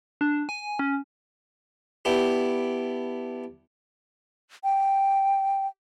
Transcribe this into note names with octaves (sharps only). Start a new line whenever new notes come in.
D4
G#5
C#4
B3 D4 E4 G4
G5